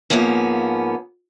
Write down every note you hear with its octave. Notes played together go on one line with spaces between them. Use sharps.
G#2 B2 F3 A#3 B3 C#4